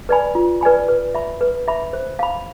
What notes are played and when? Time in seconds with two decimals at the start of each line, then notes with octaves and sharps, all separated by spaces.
0.09 B4 D5 G#5 B5
0.35 F4
0.61 B4 D5 G#5 B5
0.88 B4
1.14 E5 B5
1.41 B4
1.68 E5 B5
1.93 C5
2.19 F5 B5